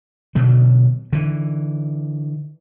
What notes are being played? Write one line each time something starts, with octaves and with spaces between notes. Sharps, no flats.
B2 D3 F#3
D3 E3